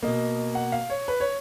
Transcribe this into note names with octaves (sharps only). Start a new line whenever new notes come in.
B2 A#3 D#5
F#5
F5
C#5
B4
C#5